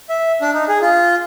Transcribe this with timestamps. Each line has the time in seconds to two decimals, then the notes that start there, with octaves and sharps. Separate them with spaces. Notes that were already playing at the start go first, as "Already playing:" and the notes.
0.09 E5
0.41 D4
0.54 D#4
0.68 G#4
0.82 F4